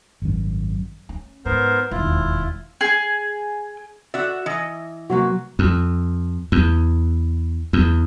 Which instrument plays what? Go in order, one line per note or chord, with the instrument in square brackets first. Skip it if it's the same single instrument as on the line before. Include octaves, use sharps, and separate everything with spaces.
[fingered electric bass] G#1 F#2
[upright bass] C#4
[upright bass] G#2 [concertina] B3 A#4 C5
[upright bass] E1 D#2 [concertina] E4 F4
[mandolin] G#4
[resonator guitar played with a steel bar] F#4 E5 [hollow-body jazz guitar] D5
[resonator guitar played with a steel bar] E3 [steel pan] D#5
[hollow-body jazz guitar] C3 F#3 A#3 [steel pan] F#4
[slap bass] F2
E2
E2